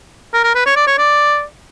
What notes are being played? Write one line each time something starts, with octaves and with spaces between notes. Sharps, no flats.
A#4
A#4
B4
C#5
D5
C#5
D5